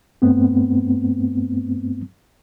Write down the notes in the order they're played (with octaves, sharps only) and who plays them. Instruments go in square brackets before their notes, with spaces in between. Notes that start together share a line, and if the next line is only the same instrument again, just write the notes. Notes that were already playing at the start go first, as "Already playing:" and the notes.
[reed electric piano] G2 A3 B3 C4